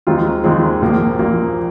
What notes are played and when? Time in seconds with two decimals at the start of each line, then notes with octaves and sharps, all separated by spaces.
0.07 D#2 D#3 G#3 C4 F4
0.44 D#2 D#3 G#3 C4 F4
0.82 A#1 A#2 F3 A#3
1.19 A#1 A#2 F3 A#3